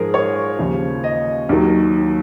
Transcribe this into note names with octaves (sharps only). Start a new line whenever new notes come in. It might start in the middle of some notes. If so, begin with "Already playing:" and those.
Already playing: G#2 F3 G#3 G#4 A#4
C#5
D#2 C#3 F3
D#5
D#2 D#3 F#3